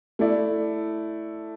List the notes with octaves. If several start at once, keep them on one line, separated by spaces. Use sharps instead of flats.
A3 E4 D5